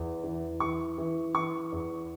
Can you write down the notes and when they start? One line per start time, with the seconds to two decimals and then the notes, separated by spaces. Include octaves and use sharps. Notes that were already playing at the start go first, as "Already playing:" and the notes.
Already playing: E2
0.24 E3
0.60 E3 C#6
0.98 E3
1.34 E3 C#6
1.72 E2